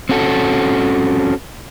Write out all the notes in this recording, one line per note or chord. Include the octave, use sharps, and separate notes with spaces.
C4 C#4 F#4 A4